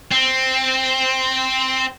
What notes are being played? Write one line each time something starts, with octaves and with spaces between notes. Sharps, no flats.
C4